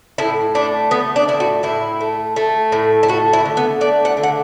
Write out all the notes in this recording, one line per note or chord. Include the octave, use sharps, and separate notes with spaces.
A2 E4
A3 D4
A3 B3
D4
A2 E4
F#4
A2 E4
A3
A3
A2
E4
A3 F#4
E4
D3
B3
A3 D5
F#5
D3
F#5